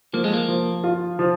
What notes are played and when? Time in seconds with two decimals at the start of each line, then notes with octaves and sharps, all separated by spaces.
0.13 F3 A#3
0.24 G#3
0.33 A#3
0.48 F3
0.84 F4
1.19 F3